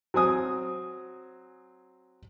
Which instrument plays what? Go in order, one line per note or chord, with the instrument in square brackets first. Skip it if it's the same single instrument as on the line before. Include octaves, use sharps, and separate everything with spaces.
[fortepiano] F#3 C4 G#5 D#6